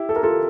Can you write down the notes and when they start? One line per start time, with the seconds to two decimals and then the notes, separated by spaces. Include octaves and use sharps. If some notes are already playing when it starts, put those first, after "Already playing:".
Already playing: E4 G4
0.09 A4
0.16 A#4
0.23 F4 A4